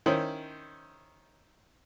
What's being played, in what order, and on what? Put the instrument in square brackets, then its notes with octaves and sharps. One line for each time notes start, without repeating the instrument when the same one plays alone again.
[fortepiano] D#3 C#4 E4 C5